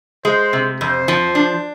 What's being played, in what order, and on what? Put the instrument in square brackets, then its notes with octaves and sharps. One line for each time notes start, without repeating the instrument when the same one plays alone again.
[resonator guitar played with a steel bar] G#3 [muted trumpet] C5
[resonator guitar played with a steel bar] C3
[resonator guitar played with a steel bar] F2 [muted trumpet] C5
[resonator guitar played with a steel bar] F3
D4